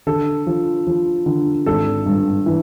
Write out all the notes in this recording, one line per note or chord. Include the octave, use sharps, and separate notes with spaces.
D3 A4
F3
F3
D3
G#1 A4
G2
E3